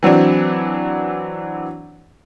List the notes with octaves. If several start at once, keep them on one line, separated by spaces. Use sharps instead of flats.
E3 F#3 C4 D4